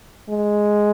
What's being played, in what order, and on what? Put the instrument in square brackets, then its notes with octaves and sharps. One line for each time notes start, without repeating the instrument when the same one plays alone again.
[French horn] G#3